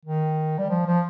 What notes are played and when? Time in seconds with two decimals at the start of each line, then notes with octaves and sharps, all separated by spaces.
0.05 D#3
0.58 G3
0.69 F3
0.86 F3